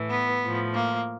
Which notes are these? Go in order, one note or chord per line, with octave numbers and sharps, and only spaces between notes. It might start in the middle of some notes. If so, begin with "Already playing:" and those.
Already playing: A2 E3
B3
A2 F3
A#3